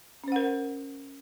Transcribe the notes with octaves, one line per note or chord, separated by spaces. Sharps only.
C#4 A#4 C5 F#5